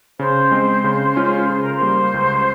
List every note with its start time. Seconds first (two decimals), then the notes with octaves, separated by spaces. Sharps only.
0.19 C#3 C5
0.51 G#3 C4
0.84 C#3
1.16 G#3 C#4 F4
1.49 C#3 C5
1.62 A#4
1.74 C5
1.81 G3 A#3
2.14 C#2